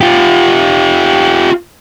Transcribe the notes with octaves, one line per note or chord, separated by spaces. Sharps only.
F4 G4